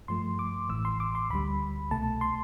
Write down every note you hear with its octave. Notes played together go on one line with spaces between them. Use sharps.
G2 F3 A3 C6
D6
A1 A2 E3 E6
C6
D6
C6
D2 D3 G3 B5
C2 B2 A3 A5
C6